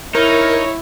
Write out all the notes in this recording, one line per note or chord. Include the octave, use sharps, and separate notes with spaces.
D#4 E4 A#4 C#5